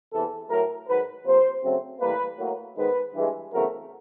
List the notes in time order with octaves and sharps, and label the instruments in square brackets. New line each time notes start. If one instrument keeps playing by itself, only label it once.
[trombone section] E2 C3 E3 A4
A2 F#3 A3 A#4
G#2 D#3 F#3 B4
C3 F3 A#3 C5
C#3 F#3 A3 C4
A2 E3 G3 A#3 B4
A2 F#3 A#3
G#2 D#3 G#3 B3 B4
G2 E3 G#3
E2 C#3 F#3 A3 C4 A#4